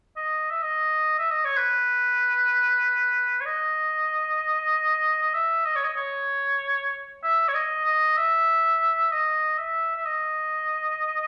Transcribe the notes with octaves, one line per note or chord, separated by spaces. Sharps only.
D#5
E5
D#5
E5
D#5
C#5
B4
C#5
D#5
D#5
E5
D#5
C#5
D#5
C#5
E5
C#5
D#5
D#5
E5
D#5
E5
E5
D#5